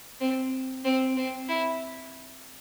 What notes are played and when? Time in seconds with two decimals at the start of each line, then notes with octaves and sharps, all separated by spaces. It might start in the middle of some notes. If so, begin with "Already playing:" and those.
0.21 C4
0.84 C4
1.17 C4
1.48 E4